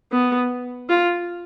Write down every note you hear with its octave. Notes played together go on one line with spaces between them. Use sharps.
B3
F4